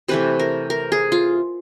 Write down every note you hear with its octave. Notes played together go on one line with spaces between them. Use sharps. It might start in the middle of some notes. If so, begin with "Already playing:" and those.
C3 E3 A3 B4
A#4
A#4
G#4
F4